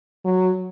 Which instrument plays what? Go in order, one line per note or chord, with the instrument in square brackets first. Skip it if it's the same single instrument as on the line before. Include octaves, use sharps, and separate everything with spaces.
[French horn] F#3